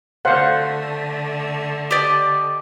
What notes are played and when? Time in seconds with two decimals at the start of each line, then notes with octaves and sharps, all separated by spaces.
0.25 D3 A3 C5 F5 F#5
1.91 G4 D5 D#5